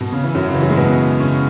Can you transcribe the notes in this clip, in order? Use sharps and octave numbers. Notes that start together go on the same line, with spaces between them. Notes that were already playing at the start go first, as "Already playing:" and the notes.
B2
C#3
E3
F#2 F#3
C#3
E3
F#3
G#3
B2 B3
C#3 C#4